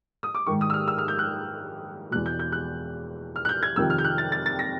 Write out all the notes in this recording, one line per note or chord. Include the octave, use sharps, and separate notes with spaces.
D#6
D6
G#2 D#3 C#6
D#6
E6
F6
E6
F6
G6
F#6
E2 B2 F#6
G6
G6
F#6
F6
F#6
G6
G#6
F2 C3 D#3 E6
F6
G6
F#6
A6
A6
A6
A#6